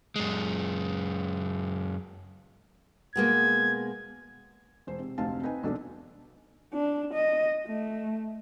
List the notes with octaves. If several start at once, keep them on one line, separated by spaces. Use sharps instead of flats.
F#2 G#3
B2 G#3 A#3 G#6
E1 C5
C3
F1 D2 C3 D#4 F5 A5
C4 D#4 B4 D#5 G#5
E1 B1 B2 D4 F#4 A4
D4
D#5
A3